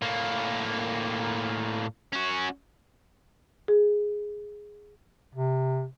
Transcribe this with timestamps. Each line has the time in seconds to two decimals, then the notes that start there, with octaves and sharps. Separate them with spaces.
0.02 A2 A#3
2.13 C#4 F#4
3.68 G#4
5.35 C3